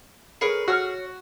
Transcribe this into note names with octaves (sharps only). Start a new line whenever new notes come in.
G#4 A#4 B4 C#5
F#4 C#5 E6 F6